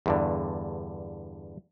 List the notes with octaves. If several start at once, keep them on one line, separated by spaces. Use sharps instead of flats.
E2 G2 D3